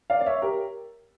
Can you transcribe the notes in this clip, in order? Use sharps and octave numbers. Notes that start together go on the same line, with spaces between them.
D5 F5
D5
C#5 E5
G4 A#4